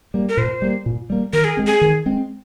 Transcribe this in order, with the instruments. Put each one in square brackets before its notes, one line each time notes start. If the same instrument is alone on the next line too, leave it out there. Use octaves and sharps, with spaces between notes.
[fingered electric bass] G3 A#3
[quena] A#4
[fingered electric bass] A#2 [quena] C5
[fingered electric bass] G3 A#3
A#2
G3 A#3
[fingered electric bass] D#3 [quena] A#4
[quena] G#4
[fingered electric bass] G#3 C4
[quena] G#4
[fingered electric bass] D#3
G#3 C4